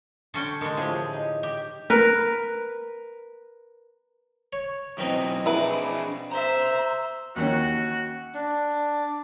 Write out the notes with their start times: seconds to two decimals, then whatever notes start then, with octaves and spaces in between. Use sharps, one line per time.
0.34 D3 C#4 G5
0.61 D3 G#3 D#4 A#4
0.77 A2 E3 F3 G4 G#4
1.13 D#4
1.43 G4
1.90 A#4 B4
4.53 C#5
4.98 F#2 B2 E3 C4 D#4
5.46 D4 E4 G#4 B4
6.32 C5 E5 A#5
7.36 D#2 D#3 C#4 F#4
8.35 D4